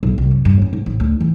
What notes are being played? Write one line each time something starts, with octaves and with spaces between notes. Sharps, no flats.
B1
C2
F#2
G2
C#4
G#2
A1
D2
E3